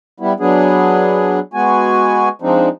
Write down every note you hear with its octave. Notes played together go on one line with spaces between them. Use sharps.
G3 B3 E4
F#3 B3 D4 G#4
G#3 B3 F#4 G#5
F3 G#3 C4 D4 D#4